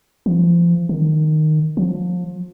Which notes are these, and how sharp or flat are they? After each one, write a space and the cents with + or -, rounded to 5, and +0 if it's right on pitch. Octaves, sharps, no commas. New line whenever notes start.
F3 -30
D#3 -10
F3 +30